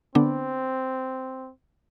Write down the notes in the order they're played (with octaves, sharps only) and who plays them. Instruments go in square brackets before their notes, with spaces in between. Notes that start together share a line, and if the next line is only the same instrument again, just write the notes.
[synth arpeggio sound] D3 B3 D4 [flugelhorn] C4